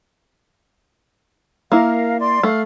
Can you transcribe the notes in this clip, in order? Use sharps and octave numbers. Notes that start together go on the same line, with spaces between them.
A#3 E4 A#4 F5
D5 C6
A3 F5